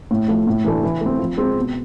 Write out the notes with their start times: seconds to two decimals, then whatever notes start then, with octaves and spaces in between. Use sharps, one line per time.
0.11 A2
0.28 F3 A3
0.47 A2
0.64 E3 A3 D4
0.84 E3
1.01 A3 C4
1.19 F3
1.37 G#3 C4
1.57 B2